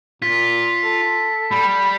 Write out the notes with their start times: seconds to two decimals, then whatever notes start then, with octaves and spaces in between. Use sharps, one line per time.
0.22 A#2 F4 B6
0.84 A4
1.51 G3 B5